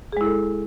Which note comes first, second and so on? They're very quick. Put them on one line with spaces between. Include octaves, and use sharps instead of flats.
G#4 G#3 E4 A4